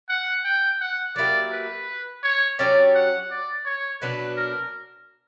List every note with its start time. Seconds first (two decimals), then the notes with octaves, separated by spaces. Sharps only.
0.09 F#5
0.45 G5
0.81 F#5
1.16 F#3 A#3 E4 G4 D5
1.52 B4
2.23 C#5
2.59 F#3 C#4 G4 C#5 D5
2.95 F#5
3.31 D5
3.65 C#5
4.02 B2 F#3 B3 D4 B4
4.37 A#4